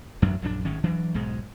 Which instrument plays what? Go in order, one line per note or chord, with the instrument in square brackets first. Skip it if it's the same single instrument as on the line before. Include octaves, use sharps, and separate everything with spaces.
[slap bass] A1 F#2 F#3 D4
A#1 F#2 E3 D4
G#1 A2 D#3 C#4
E3 F#3 D4
B1 G#2 B2 G#3